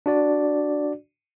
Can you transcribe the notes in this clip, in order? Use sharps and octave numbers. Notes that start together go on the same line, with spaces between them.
D4 F#4 D5